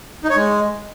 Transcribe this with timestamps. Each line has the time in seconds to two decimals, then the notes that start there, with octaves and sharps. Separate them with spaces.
0.24 D#4
0.30 C#5
0.36 G#3